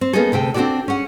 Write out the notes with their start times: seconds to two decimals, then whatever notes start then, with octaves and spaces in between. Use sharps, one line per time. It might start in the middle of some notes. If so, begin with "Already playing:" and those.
0.01 C4
0.13 A#3 B3 C#4 D#4 G#4 A4
0.32 D2 C3 A4 G5
0.54 C4 D4 F4 F#4 A4 D5
0.88 C#4 G#4 F#5